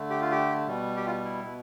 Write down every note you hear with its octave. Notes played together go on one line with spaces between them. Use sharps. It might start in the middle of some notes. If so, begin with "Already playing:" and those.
Already playing: D3 A3
G4
F4
G4
B2 G3
G4
F4
E4
B2